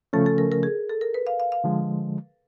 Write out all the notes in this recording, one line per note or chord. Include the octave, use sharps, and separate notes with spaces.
C#3 F3 A3 C#4 A4
A4
A#4
A#4
G#4
A4
A#4
B4
F5
F5
F5
D3 F3 G#3